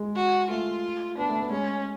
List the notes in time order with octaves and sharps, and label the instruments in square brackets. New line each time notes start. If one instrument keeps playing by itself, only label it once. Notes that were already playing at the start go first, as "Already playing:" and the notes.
Already playing: [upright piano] G#3
[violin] F#4
[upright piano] A3 [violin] F4
[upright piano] B3 [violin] D4
[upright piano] A3
B3
[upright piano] G#3 [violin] C#4